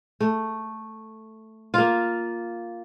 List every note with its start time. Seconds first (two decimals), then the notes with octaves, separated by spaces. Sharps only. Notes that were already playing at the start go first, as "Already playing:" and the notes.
0.20 A3
1.74 A#3 F4